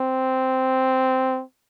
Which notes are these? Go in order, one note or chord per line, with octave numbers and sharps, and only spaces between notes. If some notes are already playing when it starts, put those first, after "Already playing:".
Already playing: C4